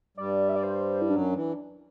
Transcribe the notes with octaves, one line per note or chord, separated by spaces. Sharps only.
G2 G3 D5
E5
D5
C5
E4
F#2 F#3 D4
E3